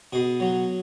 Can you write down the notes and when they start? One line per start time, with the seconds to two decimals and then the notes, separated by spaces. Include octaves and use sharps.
0.13 B2 G#4
0.40 F#3